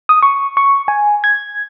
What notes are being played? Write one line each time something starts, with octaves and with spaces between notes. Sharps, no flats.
D#6
C#6
C#6
G#5
G#6